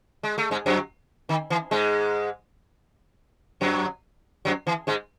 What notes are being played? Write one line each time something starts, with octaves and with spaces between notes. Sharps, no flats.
G#3
A3
G#2 G#3
F#2 F#3
D#3
E3
G#2 G#3
F#2 F#3
F#2 F#3
E3
G#2 G#3